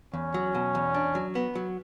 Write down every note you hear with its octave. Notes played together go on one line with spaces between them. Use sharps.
E2 C#4
F#3
B2
E2
D4
F#3
B3
F#3